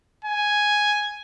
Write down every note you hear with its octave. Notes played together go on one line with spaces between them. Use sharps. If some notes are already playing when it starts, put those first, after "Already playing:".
G#5